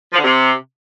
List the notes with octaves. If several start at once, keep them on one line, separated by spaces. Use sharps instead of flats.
F3
D3
C3